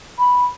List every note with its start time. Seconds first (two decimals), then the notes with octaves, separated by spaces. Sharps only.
0.19 B5